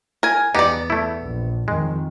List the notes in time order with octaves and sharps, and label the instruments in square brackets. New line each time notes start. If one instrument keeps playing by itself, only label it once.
[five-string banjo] A#4 G#5
[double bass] E2 [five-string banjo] B3 D5 [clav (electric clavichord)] D#4 G4
[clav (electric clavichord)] A3 E4
[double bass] A#1
[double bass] F2 D#3 [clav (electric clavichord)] G#3